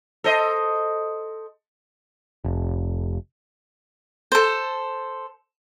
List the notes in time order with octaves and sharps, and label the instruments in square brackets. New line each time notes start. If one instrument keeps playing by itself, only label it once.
[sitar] A4 C5 D#5
[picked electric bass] F1
[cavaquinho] A4 C5